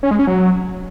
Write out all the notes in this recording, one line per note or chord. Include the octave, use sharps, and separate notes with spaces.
C#4
G#3
C#4
F#3